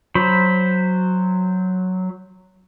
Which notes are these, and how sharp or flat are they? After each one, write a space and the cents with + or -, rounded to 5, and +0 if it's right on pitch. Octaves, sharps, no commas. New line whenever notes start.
F#3 +0 C5 +0 B5 +0